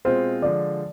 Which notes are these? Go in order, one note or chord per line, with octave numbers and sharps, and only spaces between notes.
B2 G#3 C4 F4 C5
D3 F3 G#3 D5